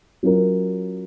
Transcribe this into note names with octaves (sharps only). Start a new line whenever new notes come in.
F#3 C#4 F4 A#4